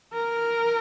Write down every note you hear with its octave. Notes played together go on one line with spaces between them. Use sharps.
A#4